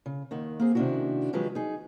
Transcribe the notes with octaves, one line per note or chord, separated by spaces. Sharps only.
C#3
D#2 D#3 F#5
A#3 C4 G#4
C3 D#3 C#4 D4 E4 F#4
D#3 F3 F#3 G#3 G4 B4
D#4 G#4